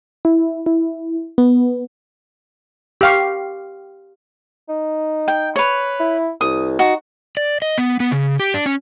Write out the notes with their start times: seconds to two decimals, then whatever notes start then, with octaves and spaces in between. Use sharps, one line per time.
0.25 E4
0.66 E4
1.38 B3
3.01 G4 F5 C#6
4.69 D#4
5.28 G5
5.56 B4 C#5
6.00 E4
6.41 C2 D#6
6.79 D#4 F#4
7.37 D5
7.62 D#5
7.78 B3
8.00 B3
8.11 C#3
8.40 G4
8.54 D4
8.66 C#4